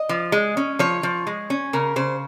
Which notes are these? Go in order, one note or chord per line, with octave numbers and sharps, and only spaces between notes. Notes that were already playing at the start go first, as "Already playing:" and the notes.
Already playing: D#5
F3
G#3
C#4
F3 C#5
F3
G#3
C#4
C#3 A#4
C#3 C5